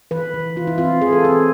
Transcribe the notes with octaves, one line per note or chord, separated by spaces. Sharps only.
E3 B4
E3
E3 F4
E4
C4 F4
E3 G#4
A4
C4 G#4